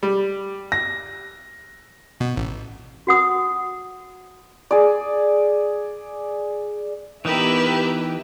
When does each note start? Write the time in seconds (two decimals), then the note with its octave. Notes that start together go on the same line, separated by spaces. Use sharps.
0.03 G3
0.72 A#6
2.20 B2
2.36 A1
3.07 F#4 F#5 D#6
4.71 G#4 D5
7.25 E3 B3 D#4 G4 A#4 B4 E5 E6